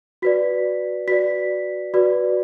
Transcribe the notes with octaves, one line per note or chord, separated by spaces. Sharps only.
F#4 B4 D5 B6
F#4 B4 D5 B6
F#4 B4 D5